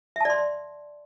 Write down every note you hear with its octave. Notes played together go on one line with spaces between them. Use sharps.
D5 E5 A5 C6